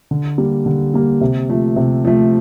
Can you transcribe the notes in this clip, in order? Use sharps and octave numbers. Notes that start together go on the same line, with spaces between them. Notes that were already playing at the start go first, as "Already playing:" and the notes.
D3
G3 A#3
D3
G3 A#3
C3
F3 A3
C3
F3 A3